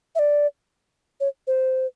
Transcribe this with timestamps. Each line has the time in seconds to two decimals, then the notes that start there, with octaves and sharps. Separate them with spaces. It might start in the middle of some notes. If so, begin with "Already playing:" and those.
0.15 E5
0.19 D5
1.20 C#5
1.47 C5